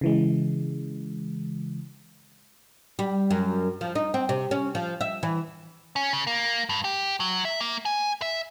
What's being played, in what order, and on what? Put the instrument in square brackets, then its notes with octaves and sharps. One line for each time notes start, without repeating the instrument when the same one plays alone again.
[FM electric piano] C#3 E3 G#3
[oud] G3
F#2
F3
D#4
C4
C3
C#4
F3
E5
E3
[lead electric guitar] C#4
C#3
A#3
G2
G4
F#3
E5
A#3
G#5
E5